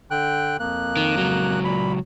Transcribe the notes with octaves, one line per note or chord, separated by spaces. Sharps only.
D3 G5 F#6
F2 A#3 F#6
D#3
C#2 F#3
A#2 B5